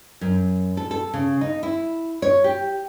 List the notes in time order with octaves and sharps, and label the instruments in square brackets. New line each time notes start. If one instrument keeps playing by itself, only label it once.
[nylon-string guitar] F#2
A4
A4
C#3
D#4
E4
C#5
G4